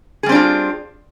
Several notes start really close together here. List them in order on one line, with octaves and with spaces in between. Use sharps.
G#4 G3 C4 D4 F4